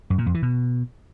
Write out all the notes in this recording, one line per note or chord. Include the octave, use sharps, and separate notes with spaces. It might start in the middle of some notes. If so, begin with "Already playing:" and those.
F#2
A#2
F2
E3
B2